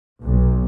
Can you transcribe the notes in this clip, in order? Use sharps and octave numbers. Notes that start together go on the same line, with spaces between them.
B1